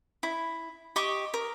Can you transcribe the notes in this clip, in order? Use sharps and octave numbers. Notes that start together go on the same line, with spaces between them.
E4
G4 D#5 C#6 D6
A#4